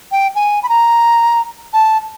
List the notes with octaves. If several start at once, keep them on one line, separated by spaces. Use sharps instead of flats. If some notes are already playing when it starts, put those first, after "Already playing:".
G5
G#5
B5
A#5
A5